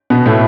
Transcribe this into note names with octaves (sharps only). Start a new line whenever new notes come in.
B2 B3
A2 A3